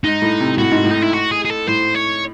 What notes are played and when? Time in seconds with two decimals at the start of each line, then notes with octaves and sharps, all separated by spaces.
0.04 G#2 D#4
0.22 A2
0.40 C3
0.58 A2 F#4
0.72 G#2
0.84 A2
0.91 D#4
1.02 E4
1.13 F#4
1.31 G#4
1.45 G#4
1.50 A4
1.67 A2 C5
1.95 C#5